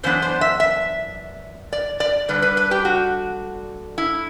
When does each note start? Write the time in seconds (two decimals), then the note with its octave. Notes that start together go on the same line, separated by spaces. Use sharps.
0.03 F#2 E3 B3 D4 C5
0.22 C5
0.41 E5
0.60 E5
1.73 D5
2.00 D5
2.29 D3 G3 D4 B4
2.42 B4
2.57 B4
2.71 G4
2.85 F#4
3.98 E4